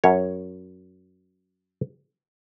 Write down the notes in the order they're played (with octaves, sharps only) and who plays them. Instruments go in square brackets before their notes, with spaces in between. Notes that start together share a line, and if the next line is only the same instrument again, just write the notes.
[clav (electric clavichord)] F#2 C#5